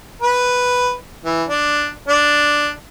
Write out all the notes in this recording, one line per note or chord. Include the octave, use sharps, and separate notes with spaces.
B4
E3
D4
D4